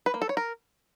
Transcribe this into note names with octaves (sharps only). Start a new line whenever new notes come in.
B4
A#3
A4
C#5
A#4